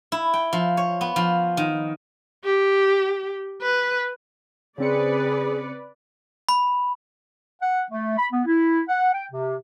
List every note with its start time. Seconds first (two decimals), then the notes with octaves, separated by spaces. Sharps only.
0.12 E4
0.34 G5
0.53 F3
0.77 C#5
1.01 B3
1.16 F3
1.57 D#3
2.44 G4
3.62 B4
4.78 C#3 C4 G#4 B4 D5 C#7
6.49 B5
7.62 F#5
7.91 A3
8.18 B5
8.32 B3
8.46 E4
8.89 F#5
9.14 G5
9.32 C3